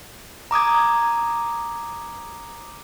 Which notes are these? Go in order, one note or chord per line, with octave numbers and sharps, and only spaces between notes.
A#5 D6 D#6 G#6